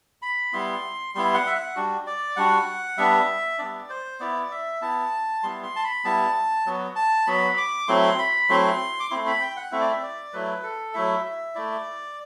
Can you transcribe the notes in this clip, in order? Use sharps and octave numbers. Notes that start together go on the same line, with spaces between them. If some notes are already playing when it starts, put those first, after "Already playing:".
B5
G3 B3 E4 C6
G3 B3 E4 C6
F#5
E5
F#5
G3 D4 F#4
D5
G3 D4 F#4 F#5
G3 B3 D4 E5
G3 B3 D4 D5
C5
B3 E4 D5
E5
B3 E4 A5
G3 B3 E4 C6
C6
A5
B5
G3 B3 E4 A5
F#3 B3 F#4
A5
F#3 B3 F#4 B5
D6
F#3 A3 C4 E4 C6
B5
F#3 A3 C4 E4 C6
D6
A3 C4 E4 C6
B5
G5
F#5
A3 C4 E4 E5
D5
E5
D5
F#3 A3 E4 B4
A4
F#3 A3 E4 E5
E5
A3 E4 D5